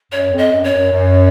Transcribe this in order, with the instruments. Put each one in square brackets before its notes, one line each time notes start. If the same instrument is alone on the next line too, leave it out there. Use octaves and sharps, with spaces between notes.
[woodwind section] F#2 [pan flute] C#5
[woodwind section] F2
[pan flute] D#5
[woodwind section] F#2
[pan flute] C#5
[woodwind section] F#2
F#2